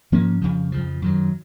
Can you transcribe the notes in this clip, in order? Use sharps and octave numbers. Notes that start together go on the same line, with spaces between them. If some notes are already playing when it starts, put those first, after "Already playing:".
G#2 F3 A#3 C#4
F2 C#3 F3
F2 C#3 F3
F#2 D#3 F#3